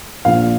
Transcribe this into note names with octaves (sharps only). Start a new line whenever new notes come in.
A#1 A#2 F3 F5